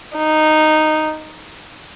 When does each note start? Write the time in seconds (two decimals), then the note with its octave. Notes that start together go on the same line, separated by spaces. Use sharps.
0.17 D#4